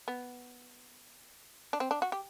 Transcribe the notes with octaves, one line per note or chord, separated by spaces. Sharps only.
B3
D4
C4
D4
F#4
G4